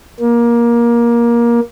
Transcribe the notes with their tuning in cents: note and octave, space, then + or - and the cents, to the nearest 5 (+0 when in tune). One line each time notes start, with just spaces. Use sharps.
A#3 +20